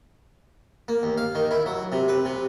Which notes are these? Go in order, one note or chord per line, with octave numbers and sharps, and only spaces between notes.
A#3
D#2
F5
D#3
E4
F#3
C3
B4
C3